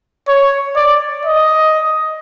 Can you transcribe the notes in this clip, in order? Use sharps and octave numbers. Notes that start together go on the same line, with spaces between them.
C#5
D5
D#5